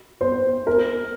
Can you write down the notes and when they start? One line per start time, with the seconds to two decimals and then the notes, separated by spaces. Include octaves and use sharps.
0.21 C5
0.67 A#4